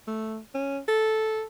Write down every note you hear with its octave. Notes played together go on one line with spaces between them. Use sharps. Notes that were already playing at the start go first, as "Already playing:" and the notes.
A3
C#4
A4